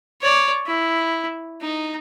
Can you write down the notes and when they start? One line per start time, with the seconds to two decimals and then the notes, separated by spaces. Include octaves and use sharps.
0.21 C#5 D5
0.67 E4
1.61 D#4